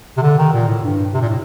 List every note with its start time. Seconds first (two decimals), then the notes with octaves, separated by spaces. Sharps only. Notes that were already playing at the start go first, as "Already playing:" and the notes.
0.17 C3
0.22 D3
0.38 D#3
0.53 A#2
0.68 A2
0.84 G2
1.14 C3
1.21 A#2
1.29 A2